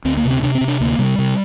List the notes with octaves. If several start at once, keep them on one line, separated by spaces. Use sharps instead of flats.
D2 C4
A#3
C3
C4
C3 D4
C4
C3
D4
D2 A#3
C3 G3
C3